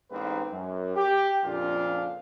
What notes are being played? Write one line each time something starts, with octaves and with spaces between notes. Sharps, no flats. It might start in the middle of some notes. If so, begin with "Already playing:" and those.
A1 G#2 A#3 C4 D#4 B4
F#2
G4
F2 A#2 C#3 F3 D4 F4